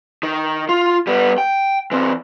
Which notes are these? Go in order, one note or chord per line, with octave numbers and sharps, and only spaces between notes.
D#3
F4
G3 B3
G5
E3 C4